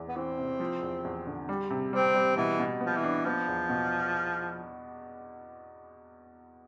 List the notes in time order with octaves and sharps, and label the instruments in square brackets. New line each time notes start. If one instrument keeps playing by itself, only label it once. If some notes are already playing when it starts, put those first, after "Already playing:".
Already playing: [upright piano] E2 E3
[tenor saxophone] B3
[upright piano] E3 [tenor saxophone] C4
[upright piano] C3
F3
E2
E2
D3
G3
C3
[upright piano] G3 [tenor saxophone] C4
[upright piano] G3
[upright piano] B2 [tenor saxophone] E3
[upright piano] B2
[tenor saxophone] F3 [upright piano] B3
[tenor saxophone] E3
[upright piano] D4
[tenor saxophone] F3 [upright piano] B3
[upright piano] E2
B2